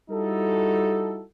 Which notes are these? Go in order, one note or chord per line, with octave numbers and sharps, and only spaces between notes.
G3 D#4 E4 F#4 A4